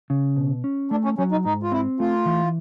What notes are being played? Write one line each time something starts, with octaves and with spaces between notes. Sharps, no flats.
C#3
B2
C#4
A3 D4
C#4
F#3 C#4
D#4
G#2 D#4
F4
C4 E4
A3 F4
E3